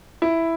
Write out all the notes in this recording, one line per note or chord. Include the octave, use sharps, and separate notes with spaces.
E4